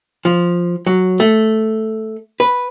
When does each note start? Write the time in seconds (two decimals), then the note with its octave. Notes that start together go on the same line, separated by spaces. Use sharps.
0.25 F3
0.86 F#3
1.20 A3
2.40 B4